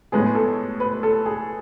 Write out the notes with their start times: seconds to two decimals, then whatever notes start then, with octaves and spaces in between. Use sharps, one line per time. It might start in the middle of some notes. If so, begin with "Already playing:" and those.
0.12 A2 G#3 B3 G#4
0.35 A4
0.80 B4
1.03 A4
1.26 G#4